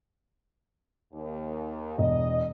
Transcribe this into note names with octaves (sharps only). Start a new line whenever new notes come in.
D#2
E1 D#5